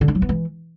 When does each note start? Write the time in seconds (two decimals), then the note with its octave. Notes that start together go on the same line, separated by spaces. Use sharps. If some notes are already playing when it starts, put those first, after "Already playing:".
0.01 D3
0.08 D4
0.15 F#3
0.22 B3
0.29 E3